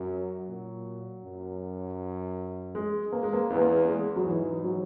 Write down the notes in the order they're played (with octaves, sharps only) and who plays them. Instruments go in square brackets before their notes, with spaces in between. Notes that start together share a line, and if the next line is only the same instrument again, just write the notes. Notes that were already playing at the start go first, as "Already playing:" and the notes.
Already playing: [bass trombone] F#2 [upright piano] F#3
[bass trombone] A#2
F#2
[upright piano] G#3
A#3
G#3
A#3
[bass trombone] E2 [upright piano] B3
[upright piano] A#3
B3
G#3
F#3
[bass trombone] G#2 [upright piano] E3
[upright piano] F#3